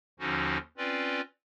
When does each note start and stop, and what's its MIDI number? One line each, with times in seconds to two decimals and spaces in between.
0.20 0.58 39
0.20 0.58 50
0.20 0.58 53
0.20 0.58 61
0.20 0.58 63
0.20 0.58 66
0.77 1.21 60
0.77 1.21 61
0.77 1.21 65
0.77 1.21 71
0.77 1.21 74